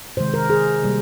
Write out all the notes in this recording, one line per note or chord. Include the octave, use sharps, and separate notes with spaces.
C3 D#3 G#3 C5
A#4
G#4
C3 G3 A#3